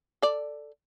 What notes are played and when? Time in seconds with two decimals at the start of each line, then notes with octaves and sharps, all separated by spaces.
0.22 A4 D5